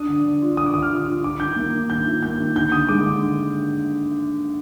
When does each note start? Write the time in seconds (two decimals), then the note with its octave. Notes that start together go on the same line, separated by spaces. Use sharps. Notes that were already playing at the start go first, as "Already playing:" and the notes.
Already playing: D4 D#6
0.08 D3
0.25 D4
0.42 F4
0.57 D3 D#6
0.66 D6
0.74 D3 D#6
0.82 F6
0.90 F4
1.08 F4
1.23 F4 D6
1.40 D#3 G6
1.56 A#3
1.73 D#3
1.90 D#3 G6
2.06 F4
2.23 A#3 G6
2.40 D#3
2.56 D3 G6
2.72 D3 D#6
2.89 G#3 D6
3.06 D3